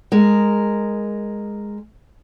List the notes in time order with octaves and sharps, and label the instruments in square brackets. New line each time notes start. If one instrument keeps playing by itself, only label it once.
[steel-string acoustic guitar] G#3 A#4